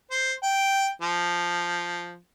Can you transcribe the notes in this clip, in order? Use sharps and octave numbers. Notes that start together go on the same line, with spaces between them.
C5
G5
F3